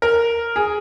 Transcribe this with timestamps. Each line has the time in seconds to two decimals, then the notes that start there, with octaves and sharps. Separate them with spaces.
0.02 A#4
0.56 G#4